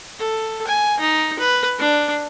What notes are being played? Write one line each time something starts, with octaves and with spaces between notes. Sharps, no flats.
A4
G#5
D#4
B4
D4